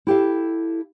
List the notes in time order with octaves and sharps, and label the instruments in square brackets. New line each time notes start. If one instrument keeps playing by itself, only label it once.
[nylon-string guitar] E4 G4 A4 F5